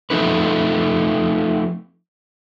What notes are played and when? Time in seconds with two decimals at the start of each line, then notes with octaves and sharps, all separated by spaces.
0.10 F3 A3 C4 D#4 B4